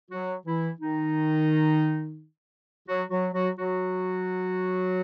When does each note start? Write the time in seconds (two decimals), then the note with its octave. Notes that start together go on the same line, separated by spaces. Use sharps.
0.10 F#3 F#4
0.46 E3 E4
0.80 D#3 D#4
2.88 F#3 F#4
3.10 F#3 F#4
3.33 F#3 F#4
3.57 F#3 F#4